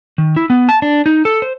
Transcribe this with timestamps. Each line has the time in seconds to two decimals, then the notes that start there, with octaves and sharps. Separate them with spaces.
0.18 D#3
0.36 E4
0.50 B3
0.69 A5
0.82 D4
1.06 D#4
1.25 A4
1.42 C5